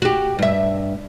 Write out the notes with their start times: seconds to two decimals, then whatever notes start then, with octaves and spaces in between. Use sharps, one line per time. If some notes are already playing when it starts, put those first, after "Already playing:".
0.02 F#4 G4
0.39 G2 E5